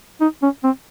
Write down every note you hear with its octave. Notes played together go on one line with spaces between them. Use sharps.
D#4
C#4
C4